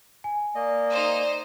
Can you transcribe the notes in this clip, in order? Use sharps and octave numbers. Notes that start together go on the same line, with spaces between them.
G#5
A#3 D5 D#5
D#4 C5